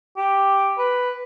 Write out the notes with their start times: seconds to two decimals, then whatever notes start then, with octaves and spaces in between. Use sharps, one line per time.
0.17 G4
0.78 B4